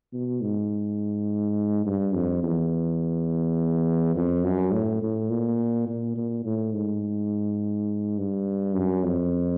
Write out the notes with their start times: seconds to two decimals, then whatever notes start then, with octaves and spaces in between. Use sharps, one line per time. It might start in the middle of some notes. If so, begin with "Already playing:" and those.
0.13 B2
0.42 G#2
1.86 G2
2.14 F2
2.43 E2
4.15 F2
4.44 F#2
4.73 A2
5.02 A2
5.30 A#2
5.88 A#2
6.16 A#2
6.45 A2
6.74 G#2
8.18 G2
8.75 F#2
9.04 F2